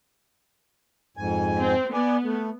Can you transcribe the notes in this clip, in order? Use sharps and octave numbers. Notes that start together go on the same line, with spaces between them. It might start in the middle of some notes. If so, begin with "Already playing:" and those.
F2 G#2 G#5
C4
B3 D5 G#5
A3